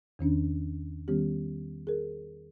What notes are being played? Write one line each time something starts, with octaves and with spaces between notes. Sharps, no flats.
E2 D#3 C#4 D4
D#3 G3 B3 C#4 G4
G#4 A#4